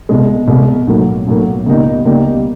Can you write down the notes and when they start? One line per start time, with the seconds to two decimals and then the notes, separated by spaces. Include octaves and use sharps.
0.09 C2 B2 G#3
0.48 C2 B2 G#3
0.87 B1 A2 F#3 A#3
1.27 B1 A2 F#3 A#3
1.66 C#2 B2 G3 A#3 D#4
2.05 C#2 B2 G3 A#3 D#4